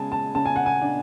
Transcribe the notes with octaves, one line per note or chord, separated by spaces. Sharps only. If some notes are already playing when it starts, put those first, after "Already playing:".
Already playing: C#3 G#3 G#5 A5
A5
C#3 A5
G#5
F#5
G#5
D4